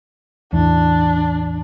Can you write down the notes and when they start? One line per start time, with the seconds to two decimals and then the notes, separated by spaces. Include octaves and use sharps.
0.53 A1 E2 D4